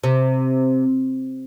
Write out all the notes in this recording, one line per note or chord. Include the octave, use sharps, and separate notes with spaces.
C3